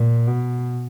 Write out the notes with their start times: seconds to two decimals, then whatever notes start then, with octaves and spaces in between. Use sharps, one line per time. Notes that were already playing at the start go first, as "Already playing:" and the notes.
Already playing: A#2
0.28 B2